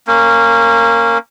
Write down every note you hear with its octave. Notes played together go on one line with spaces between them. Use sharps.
A#3 C#4